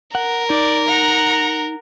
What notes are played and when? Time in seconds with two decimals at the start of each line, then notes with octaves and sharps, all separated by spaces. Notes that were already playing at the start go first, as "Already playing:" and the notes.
0.15 A#4 F#5
0.50 D#4 D5
0.87 F#5 A#5